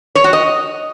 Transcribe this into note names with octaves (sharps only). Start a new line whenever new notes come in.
C#5
F#4
D#5